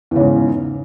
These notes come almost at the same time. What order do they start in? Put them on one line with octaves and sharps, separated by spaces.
E2 C#3 G#2